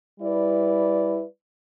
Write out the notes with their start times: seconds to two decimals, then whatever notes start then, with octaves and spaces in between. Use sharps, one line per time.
0.19 G3 E4 B4 D5